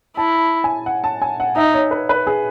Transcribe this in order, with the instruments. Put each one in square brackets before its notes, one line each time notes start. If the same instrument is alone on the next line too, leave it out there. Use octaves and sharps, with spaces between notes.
[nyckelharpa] E4 [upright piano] A5
[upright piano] G#5
F#5
A5
G#5
F#5
[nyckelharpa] D#4 [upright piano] E5
[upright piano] C#5
B4
B4
G#4